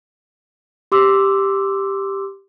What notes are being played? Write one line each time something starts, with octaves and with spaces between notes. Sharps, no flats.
G4 C6 D6 E6